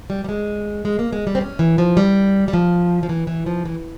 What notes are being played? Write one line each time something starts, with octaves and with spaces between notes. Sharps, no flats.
G3
G3
G#3
G#3
A#3
G#3
G3
C4
C#4
E3
F3
G3
G3
F3
F3
E3
E3
F3
E3